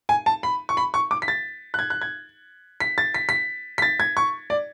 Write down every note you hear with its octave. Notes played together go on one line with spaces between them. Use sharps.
G#5
A5
B5
C#6
B5
C#6
D6
B6
A6
F#6
G#6
F#6
G#6
B6
A6
B6
B6
B6
A6
G#6
C#6
D5